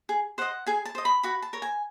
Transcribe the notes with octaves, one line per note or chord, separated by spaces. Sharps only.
G#4
C5 D#5 F#5
G#4 G#5
A5
C5 D#5
B5
F#4 B5
A5
A#4 C#5
G#5